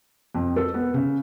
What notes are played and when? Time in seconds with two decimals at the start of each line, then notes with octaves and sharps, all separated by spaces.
0.35 F2
0.56 A4
0.74 B3
0.94 C#3